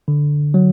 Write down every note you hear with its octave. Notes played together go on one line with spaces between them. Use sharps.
D3
F#3